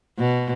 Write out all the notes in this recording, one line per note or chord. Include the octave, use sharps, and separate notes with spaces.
B2